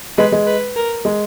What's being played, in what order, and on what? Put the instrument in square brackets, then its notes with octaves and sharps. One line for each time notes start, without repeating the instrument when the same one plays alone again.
[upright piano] G#3 [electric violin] B4
[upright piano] G#3
[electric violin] B4
A#4
[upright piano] G#3